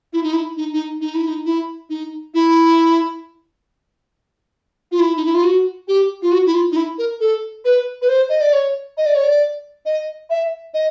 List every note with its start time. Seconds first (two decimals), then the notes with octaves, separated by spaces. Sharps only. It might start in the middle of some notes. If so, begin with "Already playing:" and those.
0.13 E4
0.23 D#4
0.33 E4
0.57 D#4
0.73 D#4
1.01 D#4
1.15 E4
1.28 D#4
1.46 E4
1.90 D#4
2.34 E4
4.92 F4
4.99 E4
5.17 D#4
5.25 E4
5.35 F4
5.44 F#4
5.88 G4
6.22 F4
6.32 F#4
6.46 E4
6.54 F4
6.72 D#4
6.76 E4
6.98 A#4
7.20 A4
7.65 B4
8.02 B4
8.09 C5
8.29 D#5
8.41 D5
8.53 C#5
8.98 D#5
9.06 D5
9.15 C#5
9.24 D5
9.86 D#5
10.30 E5
10.74 D#5